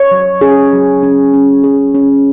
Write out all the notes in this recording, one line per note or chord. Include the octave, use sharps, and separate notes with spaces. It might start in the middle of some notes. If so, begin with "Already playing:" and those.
Already playing: C#5
F#3
C#4 G#4
F#3
C#4
C#4
F#3 G#4
C#4